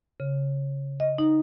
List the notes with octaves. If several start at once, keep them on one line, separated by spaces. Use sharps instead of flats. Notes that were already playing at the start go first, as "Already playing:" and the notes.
C#3
D#5
D#4